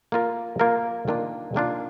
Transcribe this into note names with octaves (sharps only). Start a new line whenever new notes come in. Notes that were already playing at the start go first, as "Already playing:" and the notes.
A#3 F4 A#4
A#3 F4 A#4
D#3 A#3 D4 F4
D#3 A#3 D4 F4